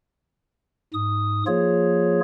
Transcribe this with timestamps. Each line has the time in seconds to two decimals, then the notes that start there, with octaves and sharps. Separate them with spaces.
0.94 G#2 D#6
1.47 F3 A#3 F4 G#4 C#5